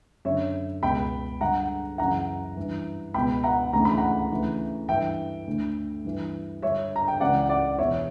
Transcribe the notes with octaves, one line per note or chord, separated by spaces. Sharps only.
F#2 D3 C#5 E5
C#2 B2 G5 B5
G2 D3 F#5 A#5
F#2 C#3 E3 F#5 A#5
G2 E3
C#2 B2 G5 B5
F#5 A#5
D2 C#3 E3 A#5
B5
F#5 A#5
D2 C#3 E3
G2 E3 E5 G5
D2 D3
G2 E3
G2 D3 C#5 E5
A#5
G5
C#2 C#3 E3 D5 F#5
D5 F#5
E2 B2 C#5 E5